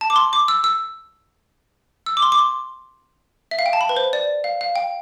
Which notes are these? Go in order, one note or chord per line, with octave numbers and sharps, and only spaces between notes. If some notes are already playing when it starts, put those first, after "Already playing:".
A5
D6
C6
D6
E6
E6
E6
D6
C6
D6
C6
E5
F5
G5
A5
B5
B4
C5
D5
F5
F5
G5